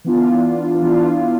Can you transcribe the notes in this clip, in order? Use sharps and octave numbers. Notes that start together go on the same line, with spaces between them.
E3 B3 D4 F4
E3 B3 D4 F4